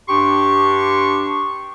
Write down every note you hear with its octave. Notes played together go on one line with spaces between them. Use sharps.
G2 D4 G4 C6 C#6